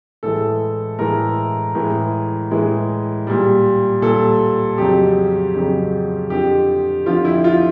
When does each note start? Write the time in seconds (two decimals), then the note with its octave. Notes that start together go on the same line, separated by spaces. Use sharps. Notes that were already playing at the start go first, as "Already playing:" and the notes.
0.23 A2 E3 G#3 A4
0.99 A2 E3 G#3 A#4
1.75 A2 E3 G#3
2.51 A2 E3 G#3
3.27 A#2 G3
4.02 A#2 G3 A4
4.78 F2 C#3 F#3 G4
5.55 F2 C#3 F#3
6.30 F2 D3 F3 G4
7.06 F2 D3 F3 F4
7.25 E4
7.44 F4